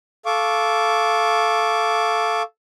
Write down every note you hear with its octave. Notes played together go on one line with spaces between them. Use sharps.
A4 F5 C#6 D6